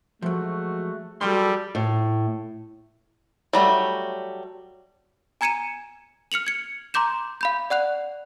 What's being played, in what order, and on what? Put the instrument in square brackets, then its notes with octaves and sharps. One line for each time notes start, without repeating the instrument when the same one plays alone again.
[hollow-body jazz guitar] F3 F#3 [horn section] G#3 A3 F#4
[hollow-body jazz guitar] F#3 G5 C6 [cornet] G3 [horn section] G#4 A4
[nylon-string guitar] A2
[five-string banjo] F#3 G3 A3
[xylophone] G#5 A#5 G#6 C#7 D#7 E7
F6 C#7 F7 F#7
G#6 C#7
A#5 C6 D6 G6 E7
F5 B5 G6
D5 F#5 F#6 F7